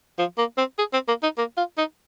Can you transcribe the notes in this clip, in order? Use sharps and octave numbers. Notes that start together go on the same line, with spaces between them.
F3
A#3
C4
G#4
C4
A#3
D#4
A#3
F4
D#4